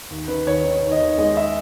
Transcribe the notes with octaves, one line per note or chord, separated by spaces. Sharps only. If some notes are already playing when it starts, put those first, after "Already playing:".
D#2
D#3 B4
D#2 C#5
D#3
D#2
D#5
D#2
G#3 D#5
E5